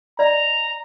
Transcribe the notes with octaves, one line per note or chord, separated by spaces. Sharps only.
D5 D#5 A#5